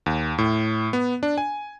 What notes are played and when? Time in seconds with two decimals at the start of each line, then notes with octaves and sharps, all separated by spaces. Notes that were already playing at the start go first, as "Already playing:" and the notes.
0.06 D#2
0.38 A2
0.93 B3
1.23 D4
1.38 G#5